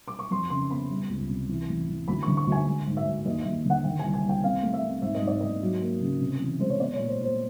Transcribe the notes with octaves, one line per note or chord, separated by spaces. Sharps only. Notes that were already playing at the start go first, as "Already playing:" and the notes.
D6
C#6
F2 C6
C#3 C6
B3 B5
G3
C#2
C3
E3
A1
E3
D2 B5
D3 C#6
C#6
D2
G#5
G#3
G#2
E5
G#2
D#2 D#5
D#2 E5
D3 F#5
D#3 G5
C2 G#5
G#5
C2
G5
C4 F5
A3
E5
C4
G#2 E5
D#5
G#2
D5
G#2 D#5
F#3
A#3
C#3
C3
E2
G#3 C5
C#5
B3 D5
C#5
A#2
C5
A#2 C5